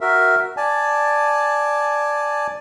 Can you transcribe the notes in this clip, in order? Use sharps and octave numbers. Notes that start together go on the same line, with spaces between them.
F#4 A#4 E5
D5 G#5 A5